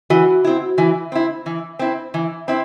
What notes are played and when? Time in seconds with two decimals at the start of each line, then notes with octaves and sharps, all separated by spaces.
0.10 E3 F#4
0.44 C4 E4
0.78 E3
1.12 C4 E4
1.46 E3
1.79 C4 E4
2.14 E3
2.48 C4 E4